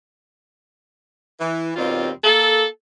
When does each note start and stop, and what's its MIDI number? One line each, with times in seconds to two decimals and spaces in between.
1.39 1.71 52
1.76 2.09 39
1.76 2.09 47
1.76 2.09 55
1.76 2.09 60
1.76 2.09 65
2.23 2.64 58
2.23 2.64 69